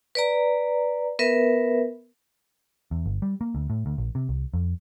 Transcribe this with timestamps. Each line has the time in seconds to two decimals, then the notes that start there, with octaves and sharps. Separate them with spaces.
0.15 B4 D5 A#5
1.19 B3 A#4 B4 E5
2.91 E2
3.06 G1
3.22 G3
3.41 A#3
3.55 D2
3.70 A2
3.86 D2
3.98 A#1
4.15 C3
4.29 C2
4.54 F2